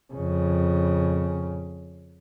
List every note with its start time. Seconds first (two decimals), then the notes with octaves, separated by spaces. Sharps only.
0.13 F2 C#3